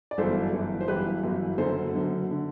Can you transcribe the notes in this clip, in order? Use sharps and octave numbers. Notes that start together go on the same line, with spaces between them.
D5
G1 F#2 E3 A4 C5
G1 F#2 E3
C5
G1 F#2 E3 G4 B4
G1 F#2 E3
F#1 F#2 D3 A4 C5
F#1 F#2 D3
D3